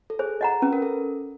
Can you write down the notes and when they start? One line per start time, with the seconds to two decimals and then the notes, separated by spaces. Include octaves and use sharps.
0.10 A4
0.19 G#4 C5
0.41 D#5 F#5 A#5
0.62 C#4 B4
0.73 A#4
0.82 A4